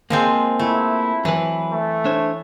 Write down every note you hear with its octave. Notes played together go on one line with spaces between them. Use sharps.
F3 G#3 A#3 C4
A3 E4
E3 F#3 B4
A3
D4 C5 C#5